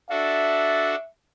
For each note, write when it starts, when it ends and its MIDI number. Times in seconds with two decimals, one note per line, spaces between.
0.10 0.95 62
0.10 0.95 66
0.10 0.95 69
0.10 1.08 76